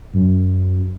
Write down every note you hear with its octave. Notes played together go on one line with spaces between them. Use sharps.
F#2